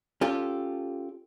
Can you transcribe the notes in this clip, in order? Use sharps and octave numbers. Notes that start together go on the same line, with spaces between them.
C#4 F4 G4 A4